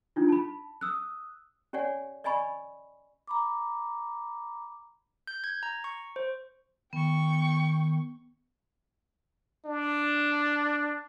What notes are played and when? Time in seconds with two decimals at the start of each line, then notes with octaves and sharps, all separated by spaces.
0.16 D4 D#4 F4
0.29 A5 B5
0.81 D#6 E6 F#6
1.73 C#4 G4 C#5 D5 F#5 G#5
2.24 D5 D#5 G#5 B5 C#6
3.27 A#5 B5 D6
5.27 G6
5.44 G#6
5.63 A#5
5.84 C#6
6.16 C5
6.93 D#3 B3 G5 C#6
9.66 D4